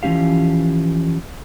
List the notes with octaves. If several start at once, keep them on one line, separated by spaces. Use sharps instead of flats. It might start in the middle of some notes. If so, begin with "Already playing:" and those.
E3 F3 G3 C#4 G4 F5